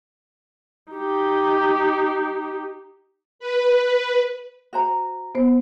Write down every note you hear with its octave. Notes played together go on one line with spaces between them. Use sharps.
D#4 G4
B4
F#4 C5 A#5
B3 C5